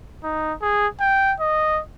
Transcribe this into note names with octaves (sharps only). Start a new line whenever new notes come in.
D#4
G#4
G5
D#5